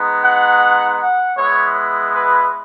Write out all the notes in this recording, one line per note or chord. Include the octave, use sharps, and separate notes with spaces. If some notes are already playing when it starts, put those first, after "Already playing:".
Already playing: G#3 B3 D#4
F#5
F#5
G#3 B3 E4 C#5
B4